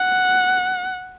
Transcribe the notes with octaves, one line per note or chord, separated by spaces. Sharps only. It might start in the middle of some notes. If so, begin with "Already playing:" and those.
Already playing: F#5